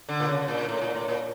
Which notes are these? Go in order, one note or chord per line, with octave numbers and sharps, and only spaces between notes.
D3
A#2
C#3
A#2
A2
A#2
A2
A#2